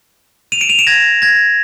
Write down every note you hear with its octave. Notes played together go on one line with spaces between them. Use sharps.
D#7 F7
D7 E7
D#7 F7
D7 E7
G#6 A#6
G#6 A#6